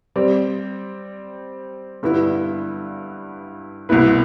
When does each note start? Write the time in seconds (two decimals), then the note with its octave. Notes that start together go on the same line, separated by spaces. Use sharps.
0.16 G3 C4 G4 D5
2.03 G2 D3 G3 B3 E4
3.89 C2 B2 B3 E4 B4